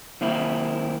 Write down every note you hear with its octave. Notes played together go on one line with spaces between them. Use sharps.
D#3 A#3 C4 E4